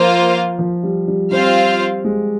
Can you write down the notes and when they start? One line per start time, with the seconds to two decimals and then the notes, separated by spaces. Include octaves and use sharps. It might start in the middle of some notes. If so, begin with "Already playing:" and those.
Already playing: F3 A#3 F4 C5 F5
0.59 F3
0.83 G3
1.08 G3
1.31 G3 C4 F4 C5 F5
2.05 G#3